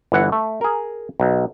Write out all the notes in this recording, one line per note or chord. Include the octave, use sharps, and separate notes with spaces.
G1 E3 F#5
A3
G#4 A#4
B1